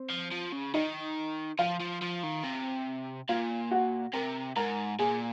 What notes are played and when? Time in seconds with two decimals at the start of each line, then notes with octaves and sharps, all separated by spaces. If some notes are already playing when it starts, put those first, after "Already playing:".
Already playing: C4 C5
0.10 F3
0.31 F3
0.52 C#3
0.74 D#3 D#4 D#5
1.59 F3 F4 F5
1.80 F3
2.01 F3
2.23 D#3
2.44 C3
3.29 A#2 F4 F5
3.71 F#4 F#5
4.13 C3 A#4 A#5
4.56 G#2 A#4 A#5
4.99 A#2 G#4 G#5